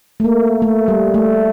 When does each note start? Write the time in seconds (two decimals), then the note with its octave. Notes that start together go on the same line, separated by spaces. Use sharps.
0.20 A3
0.24 A#3
0.62 A3
0.88 G3
1.14 A3